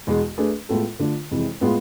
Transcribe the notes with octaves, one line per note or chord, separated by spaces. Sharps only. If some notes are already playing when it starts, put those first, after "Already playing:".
E2 B2 G#3
A3 D4 G#4 B4
A2 G#3 B3 F4 A4
D3 A3 D4 F4
F2 C3 E3 G#3
A2 G#3 B3 F4